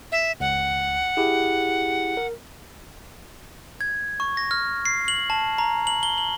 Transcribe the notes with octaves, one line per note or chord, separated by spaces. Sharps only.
E5
C#2 F#5
E4 G4 G#4
A#4
G#6
C#6
A#6
F6
C7
F#7
A5
A#5
F#7
G7
F#7